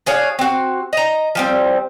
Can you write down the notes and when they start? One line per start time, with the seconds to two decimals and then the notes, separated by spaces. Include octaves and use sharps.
0.06 D4 G#4 C#5 F5
0.39 C4 F#4
0.93 D#5 A#5
1.35 F3 G3 C4